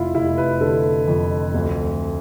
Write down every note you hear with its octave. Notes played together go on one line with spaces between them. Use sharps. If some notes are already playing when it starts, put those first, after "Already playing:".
Already playing: F1 E4 F4
F1 E4
B4
D3 A4
F2
D2